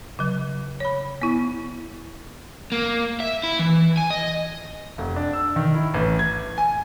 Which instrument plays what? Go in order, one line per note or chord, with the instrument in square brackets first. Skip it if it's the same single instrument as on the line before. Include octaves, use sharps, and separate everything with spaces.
[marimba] C#3 F#3
C#5 B5
B3 E4
[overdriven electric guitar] A#3
E5
E4
E3
G#5
D#5
[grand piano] F1
D4
E6
D#3
E4
A1
G#6
G#5